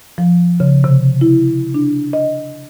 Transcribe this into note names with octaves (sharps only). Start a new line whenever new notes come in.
F3
C#3
C3
E4
D4
D#5